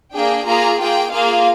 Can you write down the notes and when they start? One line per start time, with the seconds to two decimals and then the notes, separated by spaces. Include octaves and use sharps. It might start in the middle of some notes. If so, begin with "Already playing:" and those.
0.14 A#3 D4 G#4 G5
0.46 A#3 F4 G#4 A#5
0.80 A#3 F4 G#4 G5
1.12 A#3 F4 G#4 F5